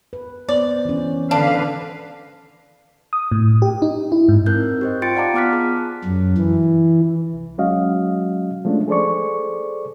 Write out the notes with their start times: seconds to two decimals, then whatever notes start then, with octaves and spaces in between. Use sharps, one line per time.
0.13 B4
0.49 B3 C5 D5
0.85 E3 C#4
1.31 D3 D4 B4 F5
3.13 D#6
3.32 A2
3.62 G4
3.82 D#4
4.12 E4
4.28 G#2
4.46 C4 D#4 A#4 F#6 G6
4.81 G4 C5 D#5
5.02 F4 G5 C6 A6 C#7 D7
5.15 D5 F5 F#5 A5 A#5 D6
5.34 B3 F4 D6 F6 F#6 B6
5.53 G#4 A5
6.04 F#2
6.38 E3
7.33 C2
7.58 F#3 G#3 C#4 F#4 D#5 F5
8.65 F3 G#3 A3 C#4 D4
8.88 G#4 A4 C5 D5 C#6